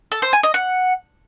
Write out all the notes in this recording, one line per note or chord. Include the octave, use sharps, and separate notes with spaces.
A4
C5
G#5
D#5
F#5